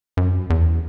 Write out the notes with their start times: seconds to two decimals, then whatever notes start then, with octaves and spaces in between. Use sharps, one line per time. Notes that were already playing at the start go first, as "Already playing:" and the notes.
0.17 F#2
0.50 E2